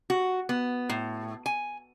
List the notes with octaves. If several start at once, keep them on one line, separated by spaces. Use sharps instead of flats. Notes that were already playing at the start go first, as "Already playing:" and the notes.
F#4
B3
A2
G#5